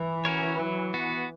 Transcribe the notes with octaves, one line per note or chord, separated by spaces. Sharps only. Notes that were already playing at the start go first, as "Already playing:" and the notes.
Already playing: E3
C#4 F#4 A#4 C#5
F#3
B3 F#4